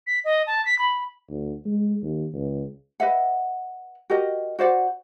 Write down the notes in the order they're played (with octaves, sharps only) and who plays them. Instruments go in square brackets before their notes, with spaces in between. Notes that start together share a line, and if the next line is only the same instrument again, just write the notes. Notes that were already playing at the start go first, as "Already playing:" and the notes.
[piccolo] B6
D#5
A5
B6
B5
[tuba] D2
G#3
D#2
C#2
[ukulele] B4 D#5 E5 F#5
F#4 G4 A#4 D#5
F#4 C5 D5 F#5